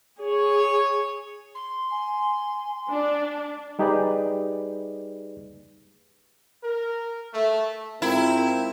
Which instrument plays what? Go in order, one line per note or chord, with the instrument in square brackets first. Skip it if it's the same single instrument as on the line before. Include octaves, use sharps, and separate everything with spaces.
[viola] G#4 [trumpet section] C#5
[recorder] C6
[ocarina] G#5
[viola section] D4
[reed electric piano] G3 D#4 G4 G#4 B4 D5
[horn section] A#4
A3
[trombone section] G#2 F4 A#4 [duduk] C4 [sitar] E4